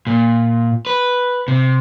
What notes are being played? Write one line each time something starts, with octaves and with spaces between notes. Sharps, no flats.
A#2
B4
C3